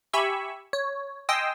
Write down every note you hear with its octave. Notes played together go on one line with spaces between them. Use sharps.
G4 E5 G#5 B5 C#6 E6
C#5
D#5 G5 G#5 C6 D#6 E6